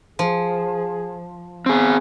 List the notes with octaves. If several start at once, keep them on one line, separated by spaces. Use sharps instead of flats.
F3 G#4
B3 C4 G#4